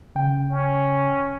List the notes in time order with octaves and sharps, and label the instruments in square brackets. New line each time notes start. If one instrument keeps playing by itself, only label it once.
[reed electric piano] C#3 G5
[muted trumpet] C#4